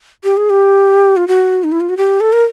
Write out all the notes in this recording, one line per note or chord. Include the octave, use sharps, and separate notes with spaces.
G4
G#4
G4
F4
F#4
D#4
E4
F4
F#4
G4
A4
A#4